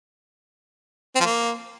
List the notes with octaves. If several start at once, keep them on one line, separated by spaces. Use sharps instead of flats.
C4
F3
A#3